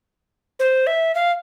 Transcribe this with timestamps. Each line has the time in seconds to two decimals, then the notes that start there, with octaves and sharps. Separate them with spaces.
0.60 C5
0.87 E5
1.15 F5